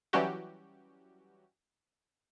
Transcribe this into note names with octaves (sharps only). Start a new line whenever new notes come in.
E3 F#3 G3 C#4 F#4 G4